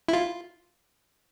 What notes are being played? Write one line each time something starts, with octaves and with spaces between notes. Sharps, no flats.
E4
F4